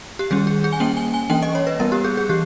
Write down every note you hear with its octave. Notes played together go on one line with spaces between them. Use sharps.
G4
D#3 G3 C#4 G#4
G#4
G#4
G#5
G3 A#3 C#4 G5
G#5
G#5
E3 A#3 C#4 G5
D#5
C#5
B4
G3 B3 A#4
G4
G#4
G#4
E3 G4